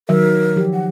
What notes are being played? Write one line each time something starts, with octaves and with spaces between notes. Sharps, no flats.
D#3 F#3 A#4 E5
F3 G4
F#5